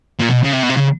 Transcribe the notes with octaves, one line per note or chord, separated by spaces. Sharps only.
A#2
B2
C#3
C3
B2
C3
C#3